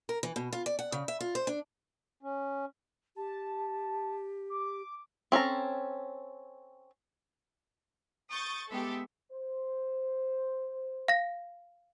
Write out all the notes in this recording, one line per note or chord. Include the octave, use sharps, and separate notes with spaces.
A#4
E3
B2
F4
D5
F#5
C#3
E5
F4
C5
D4
C#4
G4 A5
D6
C4 C#4 A4 A#5
C#6 D#6 G6 A6
G#3 B3 G4 A4 E5
C5
F5 A#6